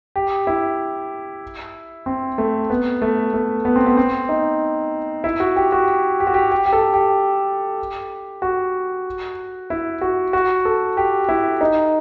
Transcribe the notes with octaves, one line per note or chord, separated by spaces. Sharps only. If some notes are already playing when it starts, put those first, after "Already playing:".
G4
E4
C4
A3
B3
A3
A3
B3
C4
B3
C4
D#4
E4
F#4
G4
F#4
G4
F#4
G4
G4
G4
A4
G4
F#4
E4
F#4
F#4
A4
G4
E4
D#4